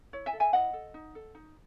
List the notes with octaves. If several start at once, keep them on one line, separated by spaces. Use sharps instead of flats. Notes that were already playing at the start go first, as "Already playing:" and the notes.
E4 C#5
E5 G#5
A4
E5 G#5
E4 D#5 F#5
A4
D#4
A4
D#4